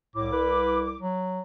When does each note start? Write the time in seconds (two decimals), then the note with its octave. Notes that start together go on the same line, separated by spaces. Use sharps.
0.16 C2 A2 E4 D6
0.32 B4
1.01 F#3